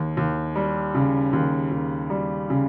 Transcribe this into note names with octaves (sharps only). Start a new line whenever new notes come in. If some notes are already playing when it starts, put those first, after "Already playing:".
Already playing: D#2
D#2
G3
C#3
D#2
D#2
G3
C#3